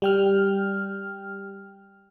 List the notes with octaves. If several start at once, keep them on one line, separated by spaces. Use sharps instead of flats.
G3 G5 F6